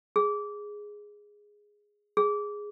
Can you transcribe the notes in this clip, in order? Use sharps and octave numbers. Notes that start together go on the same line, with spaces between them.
G#4
G#4